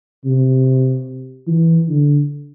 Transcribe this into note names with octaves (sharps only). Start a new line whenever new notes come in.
C3
E3
D3